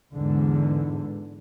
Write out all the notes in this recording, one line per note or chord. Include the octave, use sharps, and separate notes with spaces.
E2 G#2 D3